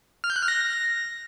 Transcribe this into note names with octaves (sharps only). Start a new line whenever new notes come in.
F6
G6
F#6
F6
A#6